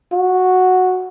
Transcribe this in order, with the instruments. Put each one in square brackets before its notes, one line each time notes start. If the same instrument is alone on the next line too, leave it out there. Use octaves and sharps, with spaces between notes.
[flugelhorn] F#4